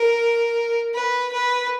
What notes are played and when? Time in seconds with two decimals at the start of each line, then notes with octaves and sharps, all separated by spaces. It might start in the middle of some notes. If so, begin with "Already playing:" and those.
Already playing: A#4
0.94 B4
1.32 B4